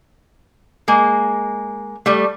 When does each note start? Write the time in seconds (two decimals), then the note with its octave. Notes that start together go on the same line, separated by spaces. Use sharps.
0.88 G#3 A#3
2.06 G3 A3